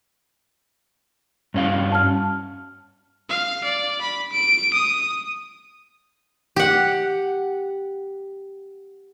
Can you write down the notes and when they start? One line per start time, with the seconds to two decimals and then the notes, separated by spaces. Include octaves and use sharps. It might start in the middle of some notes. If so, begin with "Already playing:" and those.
1.54 G2 C#4 F5
1.92 A5 F6
3.29 F5
3.64 D5
4.01 B5
4.32 D7
4.74 D#6
6.56 G4 F#5